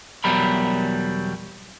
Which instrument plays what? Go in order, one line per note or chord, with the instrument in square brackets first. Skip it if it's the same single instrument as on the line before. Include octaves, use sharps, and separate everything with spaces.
[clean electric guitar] E2 B2 F#3 G3 A#4 B5